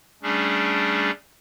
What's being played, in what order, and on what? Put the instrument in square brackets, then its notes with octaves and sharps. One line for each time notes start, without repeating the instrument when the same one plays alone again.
[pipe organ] G3 A3 C#4 D4 G#4